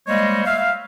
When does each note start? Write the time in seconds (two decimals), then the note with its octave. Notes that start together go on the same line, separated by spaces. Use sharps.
0.07 G3 G#3 A#3 C5 C#5 D#5
0.45 E5 F5